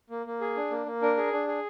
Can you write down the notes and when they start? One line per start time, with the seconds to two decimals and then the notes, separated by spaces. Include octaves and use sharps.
0.10 A#3
0.26 A#3
0.41 G#4
0.57 D4
0.71 A#3
0.86 A#3
1.02 D4 A#4
1.17 G#4
1.33 D4
1.47 G#4